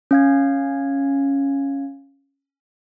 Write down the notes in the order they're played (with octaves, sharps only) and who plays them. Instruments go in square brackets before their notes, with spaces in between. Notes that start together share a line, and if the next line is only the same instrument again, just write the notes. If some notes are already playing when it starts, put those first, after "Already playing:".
[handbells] C#4 F5 G#6